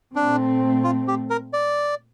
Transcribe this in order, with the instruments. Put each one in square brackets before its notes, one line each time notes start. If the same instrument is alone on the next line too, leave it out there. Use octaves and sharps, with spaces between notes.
[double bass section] A#2 A3 C4 [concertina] D4
[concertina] F4
G4
A#4
D5